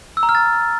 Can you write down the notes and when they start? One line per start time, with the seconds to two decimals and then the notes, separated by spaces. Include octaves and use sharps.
0.17 E6
0.23 A#5
0.29 F6
0.35 A6